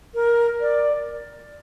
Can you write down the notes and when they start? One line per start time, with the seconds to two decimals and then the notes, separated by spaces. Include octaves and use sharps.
0.15 A#4
0.61 D5